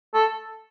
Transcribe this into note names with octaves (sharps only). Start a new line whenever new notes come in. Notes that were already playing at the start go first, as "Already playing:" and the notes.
A4